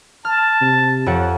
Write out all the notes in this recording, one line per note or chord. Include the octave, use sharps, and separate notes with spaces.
A5 F6
C3
F2 C#5 F#5